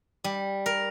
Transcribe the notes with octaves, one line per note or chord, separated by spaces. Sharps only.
G3
A#4